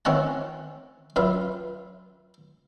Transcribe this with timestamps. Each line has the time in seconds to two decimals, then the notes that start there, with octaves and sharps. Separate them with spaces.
0.05 D#3 C4 C#4 E5 F#5 A5
1.16 F#2 F4 B4 E5